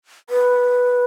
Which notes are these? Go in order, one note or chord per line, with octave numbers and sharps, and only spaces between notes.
B4